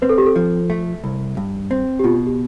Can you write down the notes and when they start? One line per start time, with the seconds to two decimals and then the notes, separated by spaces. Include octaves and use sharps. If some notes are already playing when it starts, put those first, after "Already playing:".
0.02 C4 B4
0.09 A4
0.18 G4
0.26 A4
0.36 F3
0.70 A3
1.04 C2
1.37 G2
1.71 C4
1.99 G4
2.04 B2 F4
2.26 G4